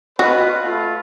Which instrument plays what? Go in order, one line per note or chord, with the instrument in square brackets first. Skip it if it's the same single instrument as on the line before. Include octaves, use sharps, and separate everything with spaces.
[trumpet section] F4 B4 [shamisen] F#4 D#5
[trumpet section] A3 F4